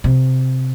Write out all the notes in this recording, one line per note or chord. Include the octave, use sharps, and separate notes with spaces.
C3